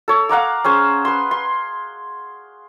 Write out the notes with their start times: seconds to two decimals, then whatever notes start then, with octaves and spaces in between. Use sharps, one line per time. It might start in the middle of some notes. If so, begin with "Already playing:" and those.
0.08 A4 C#5
0.29 F5 F#5 A#5 D6
0.64 C#4 G#4 C5
1.05 B4 C6
1.31 C6